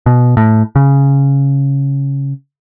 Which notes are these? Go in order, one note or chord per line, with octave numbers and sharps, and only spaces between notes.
B2
A2
C#3